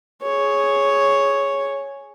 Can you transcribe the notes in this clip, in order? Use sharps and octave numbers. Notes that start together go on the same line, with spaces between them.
G#4 C#5